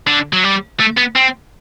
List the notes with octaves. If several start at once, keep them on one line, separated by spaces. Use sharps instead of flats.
D3
F#3
G3
A3
B3
C4